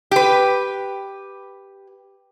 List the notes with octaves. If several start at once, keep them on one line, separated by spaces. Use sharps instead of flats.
G4 B4